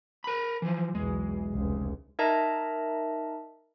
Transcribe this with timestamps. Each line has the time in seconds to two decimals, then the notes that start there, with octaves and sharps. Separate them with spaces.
0.24 A#4 B5
0.62 E3 F3
0.95 B1 E2 G#3
1.54 F1 C#2
2.19 D#4 A#4 D#5 E5 A5 A#5